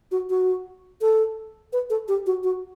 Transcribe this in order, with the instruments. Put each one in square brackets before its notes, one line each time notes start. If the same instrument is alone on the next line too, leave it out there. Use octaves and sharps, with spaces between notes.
[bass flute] F#4
F#4
A4
B4
A4
G4
F#4
F#4